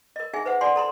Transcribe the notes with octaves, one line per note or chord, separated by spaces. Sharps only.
A#4 D#5
D#4 G#4 E5 G#5
B4 C5 E5 F#5
F4 D5 F#5 G#5 C6
A4 A#5 C6